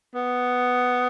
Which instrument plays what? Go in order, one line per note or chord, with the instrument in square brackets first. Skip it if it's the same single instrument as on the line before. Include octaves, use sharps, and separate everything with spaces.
[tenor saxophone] B3